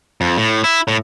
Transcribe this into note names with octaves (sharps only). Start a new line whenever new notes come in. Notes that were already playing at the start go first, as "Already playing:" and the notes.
F2
A2
E4
A2